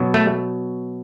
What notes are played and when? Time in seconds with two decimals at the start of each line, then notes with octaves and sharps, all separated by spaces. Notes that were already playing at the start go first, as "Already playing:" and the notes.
Already playing: B2 F#3
0.14 A3